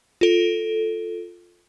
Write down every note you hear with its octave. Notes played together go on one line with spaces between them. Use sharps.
F4 A4